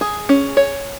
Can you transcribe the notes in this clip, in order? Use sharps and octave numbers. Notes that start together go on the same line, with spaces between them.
G#4
C#4
C#5